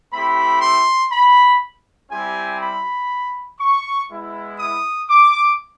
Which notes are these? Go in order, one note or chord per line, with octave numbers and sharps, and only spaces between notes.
A3 C4 E4 G4 B5
C6
B5
G3 C4 E4 G4 G#5
B5
C#6
G#3 B3 E4
D#6
D6